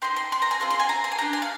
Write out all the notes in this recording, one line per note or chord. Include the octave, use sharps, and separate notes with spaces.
C4 D#4 G4 C6
C6
C6
A#5
G#5
C4 F4 G#4 C6
C6
G#5
A#5
C6
G#5
D4 G4 A#5
G#5
F5